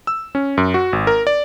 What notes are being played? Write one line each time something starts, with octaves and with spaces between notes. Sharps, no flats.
E6
C#4
F#2
F#4
G#1
A#4
D5